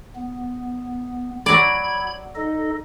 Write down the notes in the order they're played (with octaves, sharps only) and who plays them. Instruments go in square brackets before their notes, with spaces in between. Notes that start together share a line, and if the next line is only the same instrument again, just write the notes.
[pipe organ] B3
[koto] F#3 D5 [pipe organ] B5 G#6
[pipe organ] D#4 A4 D#5